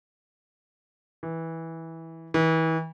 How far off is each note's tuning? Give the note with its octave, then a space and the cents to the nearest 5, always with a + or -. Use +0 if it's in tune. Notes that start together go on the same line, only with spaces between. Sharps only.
E3 -15
E3 -35